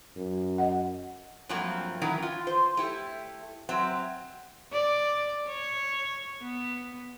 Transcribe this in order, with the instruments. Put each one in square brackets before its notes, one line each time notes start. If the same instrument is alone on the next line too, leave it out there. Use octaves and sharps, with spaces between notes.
[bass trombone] F#2
[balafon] D#5 F#5
[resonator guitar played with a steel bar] G2 F3 F#3 A3 A#3 C4
D#3 E3 F#3 C#4 E4 A#4
F4
C5
A3 E4 G4
F#3 C4 E5
[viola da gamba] D5
C#5
B3